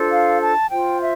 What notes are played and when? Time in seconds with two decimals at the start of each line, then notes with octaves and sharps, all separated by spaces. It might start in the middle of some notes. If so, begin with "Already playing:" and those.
Already playing: D4 F4 A4 C5
0.10 F5
0.40 A5
0.70 F4 C5 G5
1.00 E5